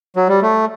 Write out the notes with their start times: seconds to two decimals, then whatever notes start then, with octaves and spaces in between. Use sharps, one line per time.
0.16 F#3
0.28 G3
0.42 A3